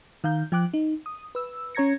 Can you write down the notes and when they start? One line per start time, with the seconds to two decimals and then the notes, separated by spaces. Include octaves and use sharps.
0.24 D#3 F5 A#5 G6
0.52 F3 G5 D6 F#6
0.74 D#4
1.06 D#6
1.35 B4 E6
1.75 C#4 C#5 A#5 G#6 A#6 C#7